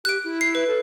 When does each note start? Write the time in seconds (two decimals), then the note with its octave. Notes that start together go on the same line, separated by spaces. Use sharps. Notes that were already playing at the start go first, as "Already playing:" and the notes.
0.05 G4 F#6 D7
0.24 E4
0.41 C7
0.55 B4
0.68 A4